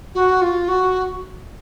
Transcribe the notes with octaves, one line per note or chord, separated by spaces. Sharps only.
F#4
F4
F#4